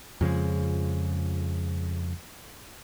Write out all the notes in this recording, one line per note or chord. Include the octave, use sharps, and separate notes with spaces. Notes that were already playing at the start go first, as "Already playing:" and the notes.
F2 C#3 F3 G#3